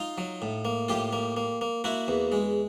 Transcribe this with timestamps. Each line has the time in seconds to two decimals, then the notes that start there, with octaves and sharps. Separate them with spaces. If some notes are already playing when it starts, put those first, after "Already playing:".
Already playing: D#4 F4
0.18 F#3
0.42 A2
0.65 A#3
0.88 A2 F4 G4
1.13 A#3
1.37 A#3
1.61 A#3
1.84 A#3 E4 F#4
2.08 E2
2.32 G#3